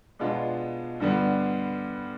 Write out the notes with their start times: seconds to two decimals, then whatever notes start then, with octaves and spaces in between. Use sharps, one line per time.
0.19 B2 G#3 B3 D4 F4
1.00 G2 D3 G3 B3